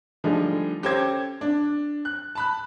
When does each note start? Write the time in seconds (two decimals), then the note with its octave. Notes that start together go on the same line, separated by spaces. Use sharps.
0.24 D3 F3 G3 A3 D#4 G#4
0.83 C#4 G4 A4 C5 D6 G#6
1.41 D4
2.05 F#6
2.35 A5 B5 F#6